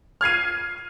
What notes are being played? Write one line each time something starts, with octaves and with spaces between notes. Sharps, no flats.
F6 G#6 C7 D#7